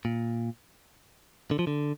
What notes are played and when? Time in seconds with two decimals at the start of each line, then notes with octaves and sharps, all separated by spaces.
0.05 A#2
1.51 D3
1.59 F3
1.67 D3